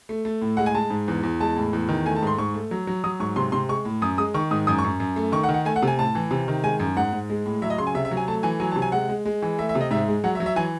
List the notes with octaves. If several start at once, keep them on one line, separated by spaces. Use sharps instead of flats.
A3
A3
A2
G#3 F#5
G#5
G#3 A5
G#2
E2
E2
G#3 A5
A2
E2
D#3
A3 G#5
A5
G#2 C6
G#2 C#6
A3
F#3
F#3
F#3 D#6
G#2 C#6
C3 C6
C3 C6
G#3 C#6
A2
F#2 D#6
G#3 D#6
D#3 C#6
G#2 D#6
F#2 D#6
C#6
F#2
F#2
A3
D#3 C#6
F#5
D#3
F#5
A3 G#5
F#5
C3
G#5
A2 A5
E3
C3
D#3
G#3 G#5
F#2
G#2 F#5
G#2
G#3
A2
F#3 E5
D#5
C#3 C6
G#5
C3 E5
E5
F#3
G#5
A3 A5
E3 G#5
F#3 G#5
A5
C3
G#5
G#3 F#5
G#3
G#3
E3
A3 E5
E5
C3
D#5
G#2 E5
G#3
F#3 F#5
E5
F#3
E5
E3 G#5